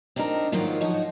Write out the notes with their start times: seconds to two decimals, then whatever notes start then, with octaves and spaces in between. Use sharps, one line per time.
0.16 C4 D4 D#4 A4 A#4
0.52 G#2 D#3 F3 F#3 A#3 F4
0.81 F3 D#4 F#4 C#5